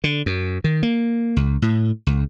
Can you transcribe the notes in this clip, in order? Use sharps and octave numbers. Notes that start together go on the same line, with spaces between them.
D3
F#2
D#3
A#3
C#2
A2
C#2